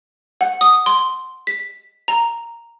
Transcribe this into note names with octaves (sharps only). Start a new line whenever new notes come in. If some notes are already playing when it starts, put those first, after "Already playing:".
F#5
D#6
C6
B6
A#5